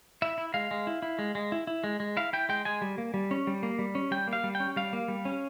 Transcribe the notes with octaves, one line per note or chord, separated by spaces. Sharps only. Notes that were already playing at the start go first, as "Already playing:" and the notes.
E4 E5
E4
G#3 F5
G#3
E4
E4
G#3
G#3
E4
E4
G#3
G#3
E4 F5
E4 G5
G#3 G5
G#3 G#5
G3
A#3
G3
C#4
G3
A#3
G3
C#4
G3 G5
A#3
F5
G3
G5
C#4
G3 F5
A#3
G3
C#4